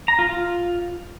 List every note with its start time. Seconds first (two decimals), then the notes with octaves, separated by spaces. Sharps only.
0.08 A#5
0.19 F4
0.29 F4